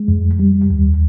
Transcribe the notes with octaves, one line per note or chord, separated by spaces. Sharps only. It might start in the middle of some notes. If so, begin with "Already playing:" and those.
Already playing: G#3
F2
G3
D#2